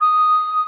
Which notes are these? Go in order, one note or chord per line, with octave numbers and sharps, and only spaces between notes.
D#6